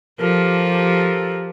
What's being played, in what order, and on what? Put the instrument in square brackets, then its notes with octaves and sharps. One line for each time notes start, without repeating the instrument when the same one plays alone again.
[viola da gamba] F3 [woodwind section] G4 A4 A#4